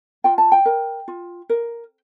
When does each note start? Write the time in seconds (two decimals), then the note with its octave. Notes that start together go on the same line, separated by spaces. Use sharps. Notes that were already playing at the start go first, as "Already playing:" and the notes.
0.24 F4 G5
0.38 A5
0.52 G5
0.65 A#4
1.08 F4
1.49 A#4